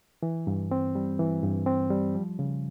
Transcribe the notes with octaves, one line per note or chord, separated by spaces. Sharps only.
E3
G2
C4
G3
E3
G2
C4
G3
F3
C#3